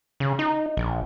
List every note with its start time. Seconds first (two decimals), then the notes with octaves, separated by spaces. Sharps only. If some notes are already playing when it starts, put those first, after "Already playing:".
0.20 C#3
0.39 D#4
0.77 A#1